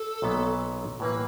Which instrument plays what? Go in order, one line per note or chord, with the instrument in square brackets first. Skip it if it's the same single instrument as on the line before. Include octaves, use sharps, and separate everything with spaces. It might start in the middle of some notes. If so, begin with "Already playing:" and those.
Already playing: [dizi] A4
[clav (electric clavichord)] B1 A#2 F#3 B3
[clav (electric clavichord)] A2 E3 G3 A#3 [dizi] B4